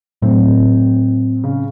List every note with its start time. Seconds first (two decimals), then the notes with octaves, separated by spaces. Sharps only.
0.22 A2 F#3 A3 C4
1.44 C#3